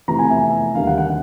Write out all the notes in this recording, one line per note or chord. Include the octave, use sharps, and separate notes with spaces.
F2 C3 E3 A3 A#5
G#5
E5
D#2 D3 G3 A#3 F5
F#5
F#5